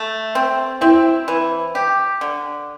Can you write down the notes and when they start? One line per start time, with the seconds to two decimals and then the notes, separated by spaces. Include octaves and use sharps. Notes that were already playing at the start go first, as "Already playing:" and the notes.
Already playing: A3
0.35 C4
0.81 C4 E4
1.28 E3
1.75 G4
2.21 D3